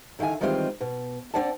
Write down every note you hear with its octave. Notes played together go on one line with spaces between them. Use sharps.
D3 D#3 E4 F5 G#5
D#3 E3 G3 G#3 C4 F4
B2
C4 D4 D5 F#5 A5